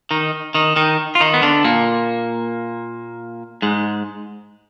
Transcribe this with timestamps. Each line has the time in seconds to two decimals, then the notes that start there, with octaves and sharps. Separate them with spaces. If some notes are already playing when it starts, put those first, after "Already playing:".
0.11 D#3 D#4
0.54 D#3 D#4
0.76 D#3 D#4
1.15 F4
1.20 D#3 D#4
1.34 B3
1.42 D3 D4
1.64 A#2 A#3
3.62 G#2 G#3